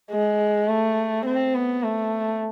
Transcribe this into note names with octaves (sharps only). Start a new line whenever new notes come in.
G#3
A3
C4
B3
A3